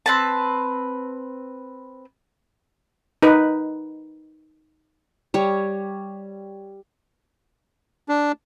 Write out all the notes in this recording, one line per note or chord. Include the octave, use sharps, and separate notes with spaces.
C4 B4 A5
D#4 B4
G3 C#5
D4